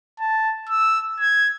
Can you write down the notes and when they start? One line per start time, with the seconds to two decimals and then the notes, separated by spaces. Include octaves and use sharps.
0.20 A5
0.69 E6
1.20 G#6